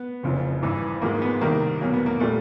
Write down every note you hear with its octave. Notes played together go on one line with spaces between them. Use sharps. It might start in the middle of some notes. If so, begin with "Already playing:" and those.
Already playing: B3
F#1 F2 C#3 F3
G#1 G2 E3
G#1 G#2 F3 G#3 A#3
B3
C2 C3 D#3 G3 A#3
E2 B2 F#3 A#3
B3
A#3
A#2 G3 A3